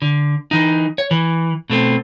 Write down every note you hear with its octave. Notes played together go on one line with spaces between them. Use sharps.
D3
E3 D#4
C#5
E3
B2 A3 C4